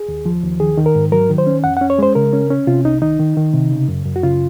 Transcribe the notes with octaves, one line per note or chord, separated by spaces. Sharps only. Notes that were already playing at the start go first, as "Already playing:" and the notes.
Already playing: G#4
D#2
F3
D#2
D#3 G#4
D#3
A#4
G#2
F#3 A#4
D#3
C5
C#4
F2 F#5
F#5
C#4
C#5
G#3 C5
C#3 A#4
C#4
C#4
C3 F4
C2 D#4
D#3 D#4
D#3
D#3
C3
C#3
F#2
F#2
F#4
C#3 F4